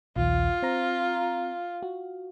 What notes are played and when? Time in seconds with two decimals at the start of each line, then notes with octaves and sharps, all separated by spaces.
0.16 A#1 D#2 F4
0.63 C4 A#5
1.83 F#4